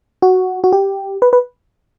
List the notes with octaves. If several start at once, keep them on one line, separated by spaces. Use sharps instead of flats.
F#4
F#4
G4
B4
B4